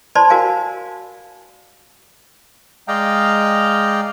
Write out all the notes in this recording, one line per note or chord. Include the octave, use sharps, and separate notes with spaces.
C5 D5 A5 B5 C6
F#4 A#4 F5 G#5
G#3 D5 D#5 F5 G5 A#5